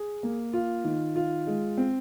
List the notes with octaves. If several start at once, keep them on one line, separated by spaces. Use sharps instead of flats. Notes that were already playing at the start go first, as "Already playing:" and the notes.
Already playing: G#4
A#3
F4
D#3
F4
G#3
C4